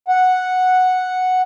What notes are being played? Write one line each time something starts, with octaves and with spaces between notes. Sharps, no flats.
F#5